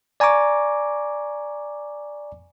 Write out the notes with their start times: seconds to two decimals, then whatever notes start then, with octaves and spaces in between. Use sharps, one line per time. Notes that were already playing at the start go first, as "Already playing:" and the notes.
0.20 D5 G#5 A#5 C#6 D6